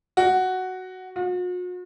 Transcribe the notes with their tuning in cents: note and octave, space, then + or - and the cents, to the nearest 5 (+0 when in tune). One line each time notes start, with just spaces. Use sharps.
F#4 +5
F#4 -45